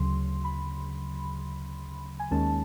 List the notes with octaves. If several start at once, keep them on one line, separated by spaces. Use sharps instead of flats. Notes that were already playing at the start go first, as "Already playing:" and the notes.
Already playing: D2 C#3 F#3 C6
B5
G#5
D#2 D#3 G#3 C#4 A5